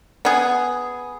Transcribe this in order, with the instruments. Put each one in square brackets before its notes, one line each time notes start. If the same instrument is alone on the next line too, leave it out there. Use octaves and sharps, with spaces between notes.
[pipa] B3 G#4